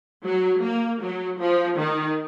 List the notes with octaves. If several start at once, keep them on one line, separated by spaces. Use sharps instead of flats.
F#3
A#3
F#3
F3
D#3